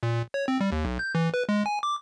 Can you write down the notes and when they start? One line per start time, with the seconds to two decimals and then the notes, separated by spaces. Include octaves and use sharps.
0.03 A#2
0.34 C#5
0.48 C4
0.61 G3
0.72 D#2
0.85 B1
0.99 G6
1.15 E3
1.34 B4
1.49 G#3
1.66 G#5
1.83 D6